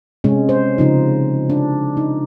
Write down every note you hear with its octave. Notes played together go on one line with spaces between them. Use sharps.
C3 G#3 C#4
C5
C#3 F3 D#4
D4
D#4